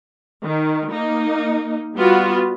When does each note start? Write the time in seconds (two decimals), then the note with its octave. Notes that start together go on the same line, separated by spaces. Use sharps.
0.45 D#3
0.90 A#3 D#4
1.95 G3 B3 F4 F#4